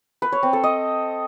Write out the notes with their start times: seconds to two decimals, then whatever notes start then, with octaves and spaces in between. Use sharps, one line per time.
0.22 B4
0.32 C#5
0.43 C4
0.53 A4
0.63 D#5